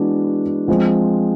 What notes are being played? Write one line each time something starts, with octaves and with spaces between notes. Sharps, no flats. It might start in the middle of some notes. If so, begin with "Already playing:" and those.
Already playing: E3 G#3 B3 D4 F#4
F3 G#3 C4